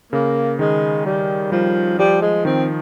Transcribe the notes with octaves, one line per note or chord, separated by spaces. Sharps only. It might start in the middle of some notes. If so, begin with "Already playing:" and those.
C#3 A#3
D#3 G#3
G3
F3 G3
F3 G3
G#3
D#3 C4